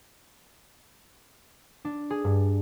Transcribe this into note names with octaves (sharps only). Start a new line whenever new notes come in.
D4
G#4
G2